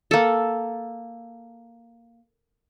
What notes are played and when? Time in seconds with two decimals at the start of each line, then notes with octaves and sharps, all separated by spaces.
0.11 A#3 A4